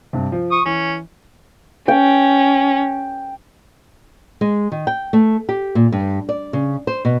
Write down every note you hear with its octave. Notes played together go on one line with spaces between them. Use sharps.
G2 C3
F3
C#6 D#6
E3 C#4
C#4 G5
G#3
D#3
G5
A3
G4
A#2
G2
D5
C#3
C5
B2